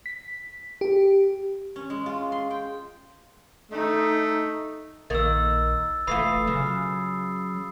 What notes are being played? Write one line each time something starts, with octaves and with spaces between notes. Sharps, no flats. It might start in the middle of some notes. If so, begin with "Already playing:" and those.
B6
G4
C#4
G#3
F4
C6
G5
A3 D#4
A#1 D#3 A#3 E6 A6
F1 E3 A3 F4 B5 D#6 C7
C#3 F#3